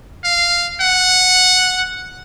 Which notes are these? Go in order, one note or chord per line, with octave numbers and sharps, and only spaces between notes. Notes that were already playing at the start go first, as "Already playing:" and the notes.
F5
F#5